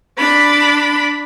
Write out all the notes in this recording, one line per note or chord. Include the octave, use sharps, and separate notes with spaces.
D4 B5